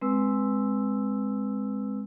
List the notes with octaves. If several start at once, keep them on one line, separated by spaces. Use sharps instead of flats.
G#3 C4 B4 E6